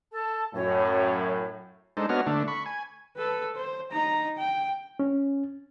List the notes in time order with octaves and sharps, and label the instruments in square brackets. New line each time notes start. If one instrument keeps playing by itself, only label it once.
[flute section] A4 A5
[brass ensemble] F#2 A2 [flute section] C#5
[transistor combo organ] G#3 D4 D#4 A4 C5
B3 D4 F#4 C#5 D#5 F6
D3 A3 D4
B5 C#6
G#5
[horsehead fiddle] A4 B4
C5
D#4 A#5
G5
[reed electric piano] C#4